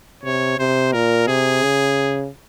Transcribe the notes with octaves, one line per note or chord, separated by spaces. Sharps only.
C3 C#5
C3 C5
A#2 A#4
C3 G#4
C#3